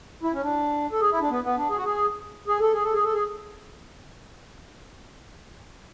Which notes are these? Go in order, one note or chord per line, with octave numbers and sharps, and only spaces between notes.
E4
C#4
D4
A4
G#4
E4
D4
B3
B3
D4
G#4
F#4
G#4
G#4
A4
G#4
A4
G#4
A4
G#4